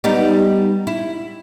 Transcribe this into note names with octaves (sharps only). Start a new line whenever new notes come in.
G3 B3 D#4
E4